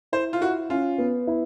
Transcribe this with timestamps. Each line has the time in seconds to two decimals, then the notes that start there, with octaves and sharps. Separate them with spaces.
0.12 E4 C5
0.33 F4
0.41 E4 F#4
0.70 C#4 F4
0.98 B3
1.27 E4